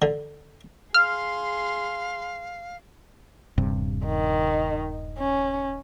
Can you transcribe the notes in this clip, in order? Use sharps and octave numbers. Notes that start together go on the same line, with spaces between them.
D3
G#4 F5 C6 F6
D#1 G2 C3
D#3
C#4